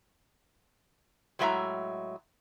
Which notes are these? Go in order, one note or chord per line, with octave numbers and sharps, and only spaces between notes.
A2 F#3 G#3 D#5 E5 A#5